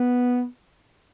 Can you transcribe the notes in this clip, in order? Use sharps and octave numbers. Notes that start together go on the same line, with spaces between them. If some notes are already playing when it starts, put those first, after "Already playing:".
Already playing: B3